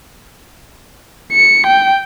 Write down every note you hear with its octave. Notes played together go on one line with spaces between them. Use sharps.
C#7
G5